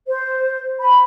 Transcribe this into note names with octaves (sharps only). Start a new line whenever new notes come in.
C5
B5